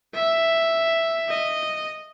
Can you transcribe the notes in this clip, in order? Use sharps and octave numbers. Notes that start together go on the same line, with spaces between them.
E5
D#5